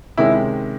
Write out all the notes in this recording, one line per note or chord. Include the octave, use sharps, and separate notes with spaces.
C3 D#3 G#3 C#4 E4